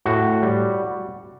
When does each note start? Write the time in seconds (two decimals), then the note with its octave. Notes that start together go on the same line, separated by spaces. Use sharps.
0.06 A2 F#4
0.43 G3